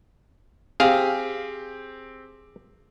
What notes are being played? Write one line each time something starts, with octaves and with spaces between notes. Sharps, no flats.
C4 G4 G#4 F5